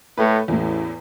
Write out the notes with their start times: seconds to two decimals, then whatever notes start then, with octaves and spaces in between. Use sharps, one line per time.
0.18 A2 A3 B4
0.48 A1 E2 A2